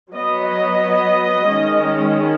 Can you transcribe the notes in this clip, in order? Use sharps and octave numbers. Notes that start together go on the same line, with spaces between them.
F#3 B3 D#5
D#5
D#3 G#3 C#4